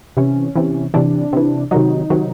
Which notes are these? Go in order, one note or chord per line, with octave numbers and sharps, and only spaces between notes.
C3 E3 C#4
C3 E3
C3 E3 D4
C3 E3
C3 D#3 F#3 D#4
C3 D#3 F#3